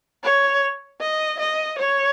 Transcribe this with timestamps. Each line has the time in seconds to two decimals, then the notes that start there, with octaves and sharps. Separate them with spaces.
0.23 C#5
1.01 D#5
1.40 D#5
1.79 C#5